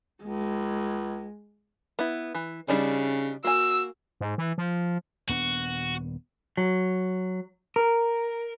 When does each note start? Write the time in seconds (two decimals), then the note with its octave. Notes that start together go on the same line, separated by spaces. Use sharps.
0.23 C#2 G#3
1.99 B3 E4
2.34 E3
2.68 C#3 G3 D4 D#4
3.44 A#3 F#4 G#5 E6
4.21 G#2
4.38 E3
4.58 F3
5.29 D#1 B3 D4 F#4
6.57 F#3
7.76 A#4